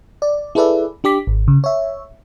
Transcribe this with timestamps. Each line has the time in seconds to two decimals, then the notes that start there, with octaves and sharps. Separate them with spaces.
0.22 D5
0.55 E4 G#4 A4 B4 D5 E5
1.04 D4 G4 D6 B6
1.27 G#1
1.48 C#3
1.64 C#5 E5